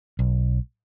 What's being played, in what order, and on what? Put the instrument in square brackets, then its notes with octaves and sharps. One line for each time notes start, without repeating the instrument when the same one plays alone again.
[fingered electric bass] B1